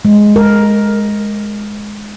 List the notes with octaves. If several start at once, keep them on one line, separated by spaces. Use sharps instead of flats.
G#3
A#4